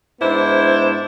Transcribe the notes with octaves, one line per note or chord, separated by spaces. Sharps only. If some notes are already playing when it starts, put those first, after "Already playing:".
G#2 B3 D4 E4 C5